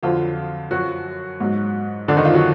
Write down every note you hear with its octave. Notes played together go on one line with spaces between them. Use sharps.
F2 D3 F3 F#3 F4
F#2 F3 F#3 F#4
G#2 F#3
F2 D3 F3 D4
D#3 D#4
F3 F4
F#3 F#4